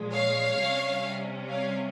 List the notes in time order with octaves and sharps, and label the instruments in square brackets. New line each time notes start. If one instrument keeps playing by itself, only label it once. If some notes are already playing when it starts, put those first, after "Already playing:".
Already playing: [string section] A#2 F3 G#3
C#5 F5
C3 G3 C#4
C#5 F5